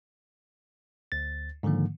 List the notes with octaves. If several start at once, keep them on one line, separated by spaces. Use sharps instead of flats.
D2 A6
G#2 D3 D#3 F3 A#3